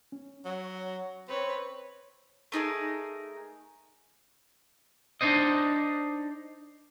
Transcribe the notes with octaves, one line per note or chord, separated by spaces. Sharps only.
C#4
F#3
C4 B4 C#5
A3 D#4 G#4 A#4
D4 D#4 C5 D#5